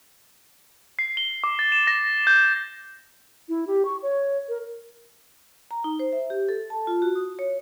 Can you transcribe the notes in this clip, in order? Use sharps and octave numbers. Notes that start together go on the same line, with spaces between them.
C7
G7
D6
A6
E7
A#6
G6
E4
G4
C#6
C#5
A#4
A#5
D#4
C5
E5
G4
A4
A5
F4
F#4
D#6
C#5